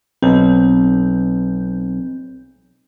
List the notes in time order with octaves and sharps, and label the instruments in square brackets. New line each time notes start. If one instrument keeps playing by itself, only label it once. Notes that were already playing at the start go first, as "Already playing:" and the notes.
[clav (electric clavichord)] B1 [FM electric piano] C4